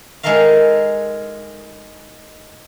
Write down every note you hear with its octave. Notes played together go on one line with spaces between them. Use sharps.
G#3 D#4 A4 A#4 E5 F5